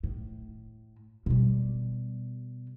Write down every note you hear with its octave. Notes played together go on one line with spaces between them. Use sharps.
A2
B2 G3